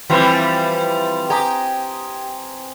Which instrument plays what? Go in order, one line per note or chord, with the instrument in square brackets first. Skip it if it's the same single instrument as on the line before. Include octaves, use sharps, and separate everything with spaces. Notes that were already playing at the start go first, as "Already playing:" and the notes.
[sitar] E3 F3 G3 [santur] C4 B4 C5
[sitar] G4 [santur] G#5 A#5 D#6